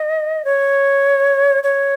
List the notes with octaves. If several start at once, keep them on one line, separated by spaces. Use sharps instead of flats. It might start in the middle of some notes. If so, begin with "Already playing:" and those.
Already playing: D#5
C#5
C#5